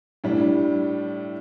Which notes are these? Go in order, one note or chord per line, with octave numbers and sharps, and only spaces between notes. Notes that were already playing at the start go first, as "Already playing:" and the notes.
A2 G3 D4